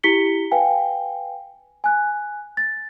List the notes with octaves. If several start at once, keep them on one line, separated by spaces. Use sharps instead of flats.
E4 G4 B6 C#7 G7
B4 F5 G5 G#5
G#5 F#6
A6